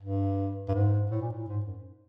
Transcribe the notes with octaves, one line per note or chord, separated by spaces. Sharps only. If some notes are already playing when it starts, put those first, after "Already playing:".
G2
G2
G#2
A2
A#2
A2
G#2
F#2